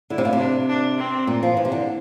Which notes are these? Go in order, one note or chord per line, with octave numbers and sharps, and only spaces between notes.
D3 E4
C3
A#2
C3
D4
D4
C4
A#2
F3
E3
C3
D3